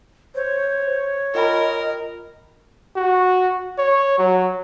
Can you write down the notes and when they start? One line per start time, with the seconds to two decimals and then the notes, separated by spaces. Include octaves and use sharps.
0.35 C5 C#5
1.35 F4 A#4 D#5 G5 B5
2.96 F#4
3.78 C#5
4.18 F#3